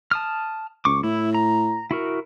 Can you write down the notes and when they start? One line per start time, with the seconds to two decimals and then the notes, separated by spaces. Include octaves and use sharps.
0.11 A5 D#6 F6
0.85 C#2 C#6 D6
1.03 A2 E4
1.35 A#5
1.91 E4 F#4 A#4